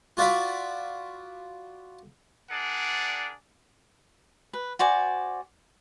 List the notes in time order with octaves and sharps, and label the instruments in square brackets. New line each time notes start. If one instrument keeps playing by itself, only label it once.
[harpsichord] F4 F#4 D5 E5 F5 B5
[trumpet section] D4 G#4 A#4 D5 F#5
[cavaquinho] B4
F#4 C5 D5 G#5